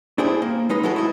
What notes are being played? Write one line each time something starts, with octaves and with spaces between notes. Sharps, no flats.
D4 E4 G4 G#4 C5
A#3
G#3 D#4 B4 D#5
F#3 G#3 E4 F#4 A4
E4 D#5